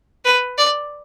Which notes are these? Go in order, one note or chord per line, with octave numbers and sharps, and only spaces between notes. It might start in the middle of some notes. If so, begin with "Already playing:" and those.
B4
D5